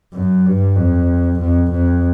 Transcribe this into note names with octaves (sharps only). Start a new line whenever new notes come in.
F#2
G2
F2
F2
F2